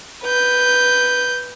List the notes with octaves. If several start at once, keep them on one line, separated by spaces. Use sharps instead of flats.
B4 G6